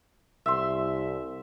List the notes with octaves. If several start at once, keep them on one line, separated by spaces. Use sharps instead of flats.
C2 E5 C6